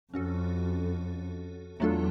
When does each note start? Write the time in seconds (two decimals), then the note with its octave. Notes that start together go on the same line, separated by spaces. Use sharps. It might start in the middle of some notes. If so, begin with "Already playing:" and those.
0.13 F2 C#4 F#4 A4
1.80 E2 F#3 A3 D4 F4 A4